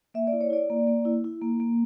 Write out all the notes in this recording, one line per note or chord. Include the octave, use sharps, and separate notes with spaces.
A#3 E5
D5
E4
C#5
E4 D5
A#3
A#3
E4
E4
A#3
A#3